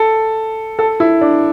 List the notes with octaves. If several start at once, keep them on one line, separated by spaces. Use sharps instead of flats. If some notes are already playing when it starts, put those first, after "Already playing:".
Already playing: A4
A4
E4
D4